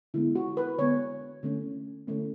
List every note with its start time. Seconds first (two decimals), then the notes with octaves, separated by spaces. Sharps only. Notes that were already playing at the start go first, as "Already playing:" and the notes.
0.14 D3 G#3 B3 E4
0.35 F#4
0.57 B4
0.79 D3 G#3 B3 C#5
1.43 D3 A3 C#4
2.07 D3 A3 C#4